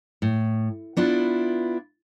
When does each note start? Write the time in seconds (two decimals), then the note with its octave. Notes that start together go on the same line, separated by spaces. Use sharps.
0.22 A2
0.97 B3 D4 E4 F4